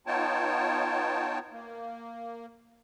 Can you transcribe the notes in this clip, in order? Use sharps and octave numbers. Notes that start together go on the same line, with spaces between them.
B3 D#4 F4 C#5 G5 A5
A#3